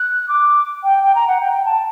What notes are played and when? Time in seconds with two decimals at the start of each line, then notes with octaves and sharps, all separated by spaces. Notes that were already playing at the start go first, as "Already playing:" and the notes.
Already playing: F#6
0.29 D6
0.84 G5
1.03 G5
1.15 A#5
1.28 F#5
1.41 G5
1.53 G5
1.65 A5